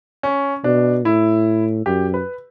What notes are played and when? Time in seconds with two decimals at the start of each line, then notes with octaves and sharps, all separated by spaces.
0.23 C#4
0.64 B2 D4
1.05 A2 E4
1.86 F#2 G4
2.14 B4